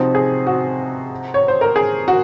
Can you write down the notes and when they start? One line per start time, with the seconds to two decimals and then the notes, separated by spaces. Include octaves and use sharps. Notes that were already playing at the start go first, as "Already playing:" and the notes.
Already playing: C3 F3 C4 D#4 F#4
0.15 G#4
0.47 F#4
1.34 C#5
1.48 C5
1.61 A#4
1.76 G#4
2.08 F#4